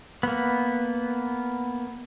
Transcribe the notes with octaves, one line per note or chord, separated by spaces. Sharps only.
A#3 B3